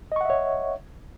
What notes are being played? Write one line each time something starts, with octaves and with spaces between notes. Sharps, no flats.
C#5 D#5 E5 F#5 C#6